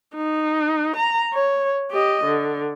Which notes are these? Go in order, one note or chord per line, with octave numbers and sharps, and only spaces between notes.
D#4
A#5
C#5
G4 D#5
D3